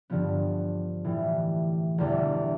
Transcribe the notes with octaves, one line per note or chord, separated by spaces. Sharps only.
G2 D3 F3 B3
A2 E3 G3
E1 E2 D3 G3